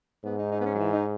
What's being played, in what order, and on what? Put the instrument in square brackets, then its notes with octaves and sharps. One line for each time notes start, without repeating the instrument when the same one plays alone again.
[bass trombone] G#2 [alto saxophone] B3
[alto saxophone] D#4
D#4
B3
C#4
F#3
E3
D#4